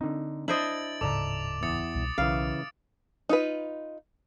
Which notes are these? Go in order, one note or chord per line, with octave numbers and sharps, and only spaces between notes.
D3 C4 D#4
D4 E4 C5 D#5 A6 D7 F#7
D1 G#2 C#3 A4 D5 A#5 D6 F7
E2 D#6 A6 C#7
C2 B2
B1 C#3 E3 F5 D7
D#4 F4 B4